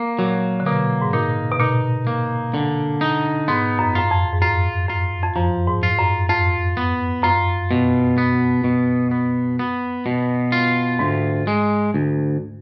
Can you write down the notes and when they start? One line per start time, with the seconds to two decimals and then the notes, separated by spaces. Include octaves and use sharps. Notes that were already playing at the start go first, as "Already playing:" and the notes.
Already playing: A#3
0.19 A#2 F#3
0.60 D3
0.66 B2 A#3
1.02 G#2
1.13 A#2 D#4
1.51 B2
1.60 A#2 D#4
2.07 A#3
2.54 D3
3.01 D#4
3.48 G#2 B3
3.79 F#2
3.89 F2
3.95 F#2 F4
4.11 F2
4.33 G#2
4.42 F#2 F4
4.89 F#2 F4
5.24 F2
5.36 F#2 F3
5.68 G#2
5.83 F4
5.99 F#2
6.29 F2 F4
6.77 B3
7.24 F#2 F4
7.71 B2
8.18 B3
8.64 B2
9.11 B3
9.59 B3
10.06 B2
10.52 F4
10.99 D2 G#2
11.47 G#3
11.94 D2